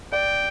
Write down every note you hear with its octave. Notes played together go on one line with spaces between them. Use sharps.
D5 G5